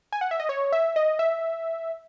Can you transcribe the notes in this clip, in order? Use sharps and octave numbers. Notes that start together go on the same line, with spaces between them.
G#5
F#5
E5
D#5
C#5
E5
D#5
E5